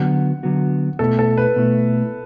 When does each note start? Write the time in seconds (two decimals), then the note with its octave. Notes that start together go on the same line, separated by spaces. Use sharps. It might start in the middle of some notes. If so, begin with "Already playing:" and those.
Already playing: D3 F#3 B3 F#4 F#5
0.43 D3 F#3 B3 F#4
0.99 B2 A3 E4 A4
1.19 A4
1.38 B4
1.56 B2 A3 E4